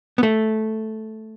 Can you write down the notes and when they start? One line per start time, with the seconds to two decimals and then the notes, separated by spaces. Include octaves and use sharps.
0.18 B3
0.23 A3